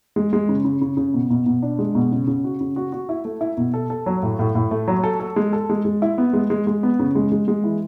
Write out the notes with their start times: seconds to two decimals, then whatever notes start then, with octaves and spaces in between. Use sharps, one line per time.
0.16 G#3
0.33 G#3
0.49 C#3
0.65 C#3
0.81 C#3
0.97 C#3
1.14 B2
1.30 B2
1.46 B2
1.62 D4
1.79 G#3
1.95 B2
2.12 C#3
2.27 C#3
2.44 F#4
2.60 C#3
2.76 F#4
2.92 F#4
3.09 E4
3.25 A3
3.41 E4
3.57 B2
3.74 A4
3.90 A4
4.06 F#3
4.23 A2
4.39 A2
4.55 A2
4.71 A3
4.88 F#3
5.04 A4
5.20 A4
5.36 G#3
5.53 A4
5.69 G#3
5.85 G#3
6.02 E4
6.18 B3
6.33 G#3
6.50 G#3
6.67 G#3
6.83 B3
6.99 C#3
7.15 G#3
7.32 G#3
7.48 G#3
7.64 E3